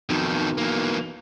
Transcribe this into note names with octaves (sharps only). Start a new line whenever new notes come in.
B1 F2 D#3
E3 A#3